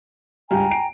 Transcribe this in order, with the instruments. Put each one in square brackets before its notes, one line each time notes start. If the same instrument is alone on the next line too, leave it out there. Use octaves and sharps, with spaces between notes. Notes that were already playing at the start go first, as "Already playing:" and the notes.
[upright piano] C#2 G2 G3 [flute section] G5 G#5 A#5
[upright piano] C7 D7